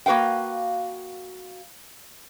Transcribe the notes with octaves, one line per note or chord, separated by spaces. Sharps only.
A#3 F#4 B4 F5 G5